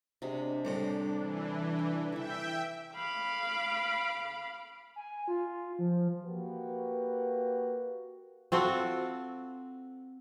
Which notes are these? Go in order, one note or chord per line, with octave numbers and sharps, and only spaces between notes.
C3 F#3 G#3 D4
C2 A2 C3 C5 A#5
E3
G5
E3 A4 E5 G5
F5 B5 D6
G#5
F4
F3
A#3 F#4 G4 B4
C4 F4 F#4 A4